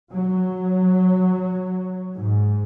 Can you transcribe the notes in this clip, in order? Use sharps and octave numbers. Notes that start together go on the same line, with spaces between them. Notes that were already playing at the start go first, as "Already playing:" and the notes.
F#3
G#2